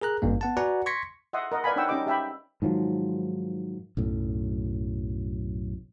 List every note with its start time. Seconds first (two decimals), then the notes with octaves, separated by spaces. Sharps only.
0.02 G#4 A#4 A#5 F#6
0.22 G#1 G2 A#3
0.41 B3 F#5 A5
0.57 F#4 B4 D5 F#5 G#5 A#5
0.86 C6 C#6 G#6 A#6 B6 C#7
1.33 D#5 E5 F#5 C6 D#6
1.52 A#4 D#5 F#5
1.64 B4 D5 F5 G#5 B5
1.76 D4 D#4 C#5 F#5 G5 E6
1.89 C#4 D#4 G4 D5 D#5 D6
2.07 G4 E5 G5 B5
2.62 G#2 D#3 F3 F#3
3.97 B1 F#2 A2